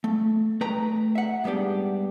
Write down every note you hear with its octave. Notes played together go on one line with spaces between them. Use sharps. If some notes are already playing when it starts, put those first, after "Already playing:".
A3
A3 B4 G5 A#5
E5 F#5
G#2 G3 B3 D4 G4